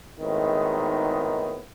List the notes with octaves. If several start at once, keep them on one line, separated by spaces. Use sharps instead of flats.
G#1 A2 D#3 G#3 B3 D#4